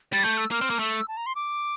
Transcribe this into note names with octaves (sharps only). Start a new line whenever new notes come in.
G3 A6
A3 G6
E6
A#3 F6
C4
A#3
A3 E6
A5
A#5
C6
D6